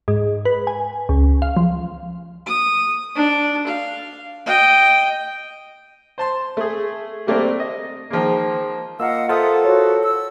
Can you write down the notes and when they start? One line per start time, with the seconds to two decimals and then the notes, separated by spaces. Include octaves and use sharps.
0.08 G#2
0.45 B4
0.67 G#5
1.09 C#2
1.42 F5
1.57 F3
2.46 D#6
3.15 D4
3.67 F5
4.46 D#5 G5
6.18 C5 A5 C6
6.57 A3 G#4
7.27 C3 G3 A3 A#3 C4 D4
7.60 D#5
8.10 D#3 F3 G#3 A#3
9.00 A#3 F4 A#4 D#5 F5 F#5 E6
9.29 F4 A4 A#4 C5 E5 F#5 D#6
9.65 F#4 C#5
10.02 E6